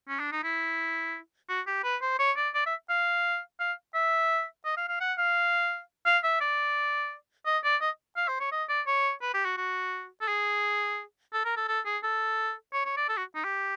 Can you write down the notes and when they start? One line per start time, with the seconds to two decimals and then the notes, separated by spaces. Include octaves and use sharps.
0.08 C#4
0.19 D4
0.32 D#4
0.44 E4
1.49 F#4
1.67 G4
1.84 B4
2.02 C5
2.19 C#5
2.37 D5
2.54 D5
2.66 E5
2.89 F5
3.60 F5
3.94 E5
4.65 D#5
4.77 F5
4.89 F5
5.01 F#5
5.18 F5
6.06 F5
6.24 E5
6.41 D5
7.46 D#5
7.64 D5
7.82 D#5
8.17 F5
8.28 C5
8.40 C#5
8.52 D#5
8.69 D5
8.87 C#5
9.22 B4
9.34 G4
9.45 F#4
9.58 F#4
10.21 A4
10.28 G#4
11.33 A4
11.45 A#4
11.57 A4
11.68 A4
11.85 G#4
12.03 A4
12.73 C#5
12.85 C#5
12.97 D5
13.09 A4
13.17 F#4
13.35 D#4
13.44 G4